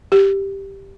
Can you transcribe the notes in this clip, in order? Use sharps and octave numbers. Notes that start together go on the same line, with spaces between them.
G4